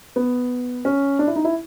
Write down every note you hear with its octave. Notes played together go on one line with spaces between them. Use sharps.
B3
C#4
D4
E4
D#4
E4